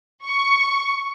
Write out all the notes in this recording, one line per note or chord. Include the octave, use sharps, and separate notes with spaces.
C#6